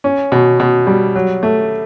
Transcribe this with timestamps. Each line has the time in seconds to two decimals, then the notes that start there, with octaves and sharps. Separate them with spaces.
0.04 C#4
0.32 B2
0.60 B2
0.87 G3
1.16 F#3
1.43 A3